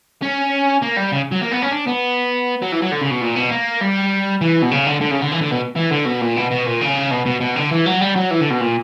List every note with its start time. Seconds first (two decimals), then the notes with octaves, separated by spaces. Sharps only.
0.22 C#4
0.82 A#3
0.96 G3
1.12 C#3
1.32 F#3
1.41 A#3
1.51 B3
1.62 C#4
1.71 D4
1.87 B3
2.62 F#3
2.72 E3
2.82 F#3
2.92 D3
3.01 C#3
3.11 B2
3.22 A#2
3.36 B2
3.51 A#3
3.81 G3
4.41 E3
4.62 B2
4.71 C#3
4.87 D3
5.01 D3
5.11 C#3
5.21 D3
5.31 E3
5.41 D3
5.51 B2
5.76 E3
5.91 D3
6.05 B2
6.21 A#2
6.36 B2
6.50 B2
6.66 A#2
6.81 C#3
7.11 B2
7.26 B2
7.41 B2
7.56 D3
7.71 E3
7.86 F#3
8.01 G3
8.16 F#3
8.31 E3
8.41 D3
8.51 B2
8.61 A#2